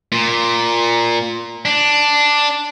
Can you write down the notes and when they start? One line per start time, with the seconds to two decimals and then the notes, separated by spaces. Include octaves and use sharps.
0.12 A#2
1.65 D4